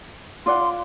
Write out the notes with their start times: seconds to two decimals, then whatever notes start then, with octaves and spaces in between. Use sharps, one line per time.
0.46 F4 D5 F#5 C6